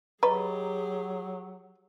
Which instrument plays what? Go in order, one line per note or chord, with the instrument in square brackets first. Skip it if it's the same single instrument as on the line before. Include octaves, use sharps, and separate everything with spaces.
[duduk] F#3 [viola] G4 G#4 [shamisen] B4 [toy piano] D#5 A#5 C#6